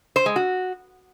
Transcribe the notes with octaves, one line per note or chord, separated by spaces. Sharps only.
C5
G#3
F#4